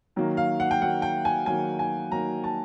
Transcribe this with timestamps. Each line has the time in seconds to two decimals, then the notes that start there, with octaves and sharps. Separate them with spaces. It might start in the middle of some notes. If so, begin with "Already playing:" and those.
0.16 D#3 F#3 A#3
0.37 F5
0.60 F#5
0.71 G5
0.81 D#3 F#3 A#3 F#5
1.02 G5
1.25 G#5
1.46 D#3 F#3 A#3 G#5
1.79 G#5
2.11 D#3 F#3 A#3 A#5
2.44 A5